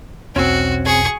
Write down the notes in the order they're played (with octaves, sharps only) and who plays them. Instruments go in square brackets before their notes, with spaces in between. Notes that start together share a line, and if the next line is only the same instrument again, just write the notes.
[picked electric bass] E1 B1 [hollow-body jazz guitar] C4 C#4 [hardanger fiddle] F#4
[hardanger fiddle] G#4 C#6